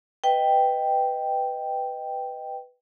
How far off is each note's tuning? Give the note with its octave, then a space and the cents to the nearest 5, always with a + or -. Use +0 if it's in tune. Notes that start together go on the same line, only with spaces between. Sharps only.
B4 +10 D#5 +0 G5 +0